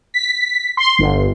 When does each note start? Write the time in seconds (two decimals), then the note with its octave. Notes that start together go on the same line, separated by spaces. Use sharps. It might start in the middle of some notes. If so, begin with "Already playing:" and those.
0.14 B6
0.77 C6
0.99 G1